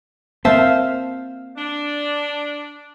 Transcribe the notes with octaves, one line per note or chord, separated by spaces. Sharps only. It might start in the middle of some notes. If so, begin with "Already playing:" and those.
A#3 C4 C5 E5 F5 A5
D4